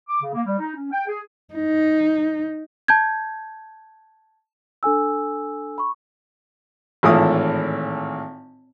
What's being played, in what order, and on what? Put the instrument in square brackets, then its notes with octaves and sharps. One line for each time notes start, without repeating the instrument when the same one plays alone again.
[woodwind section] D6
C#3
A#3
G3
D#4
C#4
G5
G#4
[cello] D#4
[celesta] A5 G6 G#6
D4 A4 G#5 E6
B5 C#6
[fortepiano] G#1 A2 E3 F4 D#6